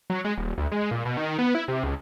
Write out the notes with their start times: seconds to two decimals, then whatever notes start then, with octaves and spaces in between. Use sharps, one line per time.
0.10 F#3
0.25 G#3
0.37 D#1
0.58 D2
0.72 G#3
0.91 A#2
1.05 B2
1.17 D#3
1.39 B3
1.55 E4
1.68 C3
1.84 C#2